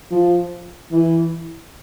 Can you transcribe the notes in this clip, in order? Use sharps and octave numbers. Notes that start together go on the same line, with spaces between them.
F3
E3